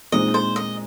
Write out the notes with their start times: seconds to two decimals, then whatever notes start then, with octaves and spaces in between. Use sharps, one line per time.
0.12 A#2 G#3 C4 D#4 D#5
0.34 C5
0.56 D#5